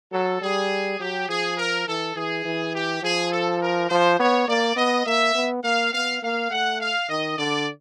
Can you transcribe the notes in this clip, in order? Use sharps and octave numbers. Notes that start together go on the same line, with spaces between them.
F#3 A4
G3 G#4
F#3 G4
F3 G#4
A#4
E3 A4
E3 G#4
E3
G4
F3 G#4
A4
A#4
F3 C5
B3 C#5
A#3 D5
B3 D#5
A#3 E5
B3
A#3 F5
B3 F5
A#3 F5
A3 F#5
F5
D#3 D#5
D3 D5